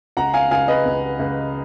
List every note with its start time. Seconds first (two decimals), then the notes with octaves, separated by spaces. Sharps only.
0.17 C#2 F#5 A#5
0.34 F5 G#5
0.51 C#2 F5 G#5
0.68 B4 D#5
0.86 C#2
1.19 C#2